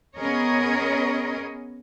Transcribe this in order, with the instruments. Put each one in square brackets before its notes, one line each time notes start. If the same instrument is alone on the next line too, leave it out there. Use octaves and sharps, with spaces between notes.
[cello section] B3 C#4 G#4 A#4 C#5 D#5